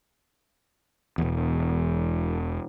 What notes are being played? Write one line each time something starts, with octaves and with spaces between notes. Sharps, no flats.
E1 E2